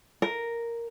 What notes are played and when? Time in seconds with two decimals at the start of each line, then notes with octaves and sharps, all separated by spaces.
0.22 A#4